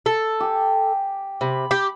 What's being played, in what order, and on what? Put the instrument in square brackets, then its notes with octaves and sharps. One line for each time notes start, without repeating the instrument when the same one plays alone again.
[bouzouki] A4
[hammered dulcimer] G4 G#5
[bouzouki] C3 [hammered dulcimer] B5
[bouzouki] G4